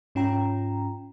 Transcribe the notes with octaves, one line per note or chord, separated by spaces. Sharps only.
G#2 C#4 F4 G5 A#5